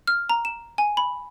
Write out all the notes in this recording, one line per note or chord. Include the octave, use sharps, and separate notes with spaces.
F6
A#5
E7
G#5
B5